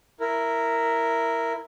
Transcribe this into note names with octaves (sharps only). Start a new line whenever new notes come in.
E4 A#4